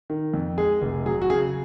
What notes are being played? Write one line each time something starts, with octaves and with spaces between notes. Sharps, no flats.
D#3
F2
G#3 G#4
F1
F#3 G#4
F#4
C#3 G#4